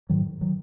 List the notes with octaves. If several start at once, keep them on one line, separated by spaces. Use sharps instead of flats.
G#2 D#3 F#3
D#3 F#3